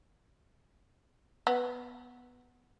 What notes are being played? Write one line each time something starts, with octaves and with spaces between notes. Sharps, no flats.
B3